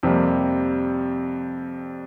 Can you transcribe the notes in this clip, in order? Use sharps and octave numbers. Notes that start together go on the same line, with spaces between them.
F2 C3 G3 A#3